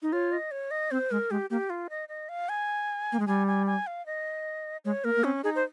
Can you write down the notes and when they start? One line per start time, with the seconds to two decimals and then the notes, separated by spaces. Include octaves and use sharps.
0.02 D#4
0.13 F4 C#5
0.32 D#5
0.51 C#5
0.71 D#5
0.91 C4 C5
1.11 G#3 A#4
1.31 G#3 G4
1.50 A#3 G4
1.70 F4
1.90 D#5
2.09 D#5
2.29 F5
2.49 G#5
3.12 A#3
3.19 G#3
3.27 G3 G#5
3.47 G#5
3.66 G#5
3.87 F5
4.06 D#5
4.85 G#3 C#5
5.04 A#3 A#4
5.16 A#3
5.24 C4 C#4
5.44 D#4 G#4
5.56 C5